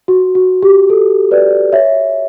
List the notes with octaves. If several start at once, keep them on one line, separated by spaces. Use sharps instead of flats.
F#4
F#4
G4
A4
B4 D5
C#5 E5